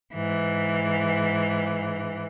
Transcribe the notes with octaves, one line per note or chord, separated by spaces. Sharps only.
G#2 E3